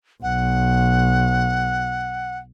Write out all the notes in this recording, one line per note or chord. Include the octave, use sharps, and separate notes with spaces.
B1 F#5